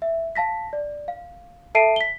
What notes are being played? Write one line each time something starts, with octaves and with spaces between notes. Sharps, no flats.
E5
F5 A5 A#6 B6
D5
F5
A4 E5 A5 C7 D7 D#7
B6 G7